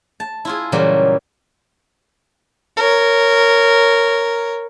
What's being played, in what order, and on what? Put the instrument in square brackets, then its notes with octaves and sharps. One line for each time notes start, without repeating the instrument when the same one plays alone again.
[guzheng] A5
E4 F4 G#4
A#2 C#3 E3 F#3 G3 A#3
[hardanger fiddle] A#4 C#5